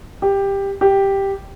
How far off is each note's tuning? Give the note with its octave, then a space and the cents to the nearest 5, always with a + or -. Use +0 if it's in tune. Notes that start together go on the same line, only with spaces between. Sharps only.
G4 +10
G4 +0